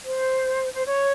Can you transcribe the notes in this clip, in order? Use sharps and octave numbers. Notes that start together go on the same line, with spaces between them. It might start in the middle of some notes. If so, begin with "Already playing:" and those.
C5
C5
C#5